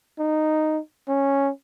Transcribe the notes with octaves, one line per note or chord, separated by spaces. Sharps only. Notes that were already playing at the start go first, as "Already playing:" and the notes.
D#4
C#4